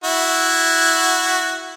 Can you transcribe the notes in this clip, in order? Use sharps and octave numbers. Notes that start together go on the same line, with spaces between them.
E4 F#4